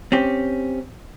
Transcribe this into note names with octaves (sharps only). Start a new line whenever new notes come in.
C4 C#4 G4